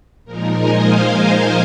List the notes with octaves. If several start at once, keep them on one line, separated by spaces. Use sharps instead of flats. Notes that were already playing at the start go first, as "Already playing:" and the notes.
A#2 F3 G#3 D#4 A#4
D#5 G#5
C5 F5